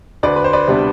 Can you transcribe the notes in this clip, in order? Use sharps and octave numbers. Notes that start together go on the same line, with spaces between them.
D2 B4 D5
B4
C5
B4 D5
C3 G3 B3 D4